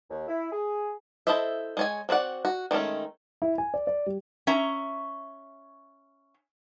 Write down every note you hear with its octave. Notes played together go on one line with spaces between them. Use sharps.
D#2
E4
G#4
E4 A4 C5 D#5 E5
G#3 C#5 G#5
C4 F#4 D5 F#5
F#4
D#3 G#3 A3 C#4
E4
G#5
D5
D5
G3
C#4 E5 A#5